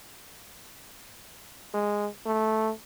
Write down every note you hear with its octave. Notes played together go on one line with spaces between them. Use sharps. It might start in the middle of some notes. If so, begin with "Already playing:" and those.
G#3
A3